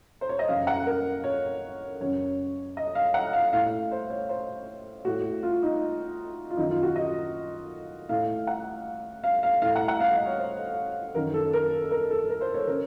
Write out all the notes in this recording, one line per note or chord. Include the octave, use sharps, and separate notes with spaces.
C5
C#5
D#5
F#2 C#3 F5
F#5
A#4
C#5
F#2 C#3 C#5
D#5
F5
F#5
F5
A2 F5
C5
C#5
C5
A2 F#4
F4
D#4
F4
F#2 D#3 D#4
F4
F#4
D#5
A2 F5
F#5
F5
F5
A2 F5
F#5
F#5
F5
D#5
C#5
C5
F#2 D#3 A#4
A4
A#4
A#4
A4
A#4
C5
C#5
C#3 A#4